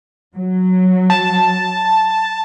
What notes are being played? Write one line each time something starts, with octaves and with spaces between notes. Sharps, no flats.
F#3
A5